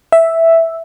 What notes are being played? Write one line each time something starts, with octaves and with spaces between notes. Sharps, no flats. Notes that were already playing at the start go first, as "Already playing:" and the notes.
E5